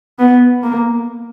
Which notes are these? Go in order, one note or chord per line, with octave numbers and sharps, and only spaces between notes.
B3
A#3